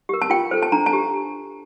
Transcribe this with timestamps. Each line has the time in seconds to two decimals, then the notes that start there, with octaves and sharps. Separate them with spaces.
0.09 G4 A#4
0.22 A5
0.30 F4 G5
0.51 A4 C5
0.62 A5
0.72 D4 A#5
0.86 A5
0.93 G4